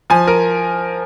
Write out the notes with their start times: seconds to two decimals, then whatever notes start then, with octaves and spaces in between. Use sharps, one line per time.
0.10 F3 G#5
0.27 A#4